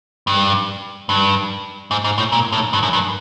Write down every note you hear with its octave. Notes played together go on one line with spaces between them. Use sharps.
G2
G2
G#2
G#2
A2
A#2
A2
G2
F#2
G2